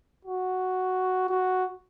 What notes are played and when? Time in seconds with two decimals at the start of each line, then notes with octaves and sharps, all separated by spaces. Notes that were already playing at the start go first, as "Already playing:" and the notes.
0.25 F#4
1.29 F#4